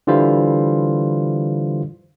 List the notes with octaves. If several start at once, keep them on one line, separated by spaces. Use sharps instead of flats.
D3 E3 G3 F4 C5